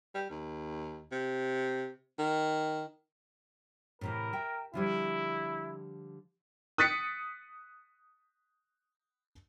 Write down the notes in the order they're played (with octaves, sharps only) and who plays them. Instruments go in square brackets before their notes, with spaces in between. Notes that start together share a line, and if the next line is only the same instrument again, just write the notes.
[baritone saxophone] G3
D#2
C3
D#3
[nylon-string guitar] A2 C3 E3 [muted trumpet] A#4
[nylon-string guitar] E5 G5
[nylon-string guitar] D3 F3 G3 [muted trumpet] E4
[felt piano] D#6 F#6 A6 B6 C#7